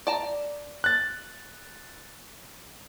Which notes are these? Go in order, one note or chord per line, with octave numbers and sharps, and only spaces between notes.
D5 A5 A#5
F#6 A6